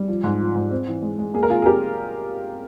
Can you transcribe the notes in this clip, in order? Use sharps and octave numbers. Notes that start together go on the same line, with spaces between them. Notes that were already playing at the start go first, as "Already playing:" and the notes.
Already playing: G3
F3
G#2
F3
G#2
C4
E3
G#3
G#3
A#3 G#4
A#4
C3 F4 G#4
G#4
F2 G4 A#4